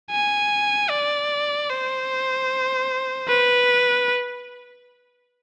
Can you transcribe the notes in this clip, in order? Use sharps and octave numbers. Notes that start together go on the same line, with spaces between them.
G#5
D5
C5
B4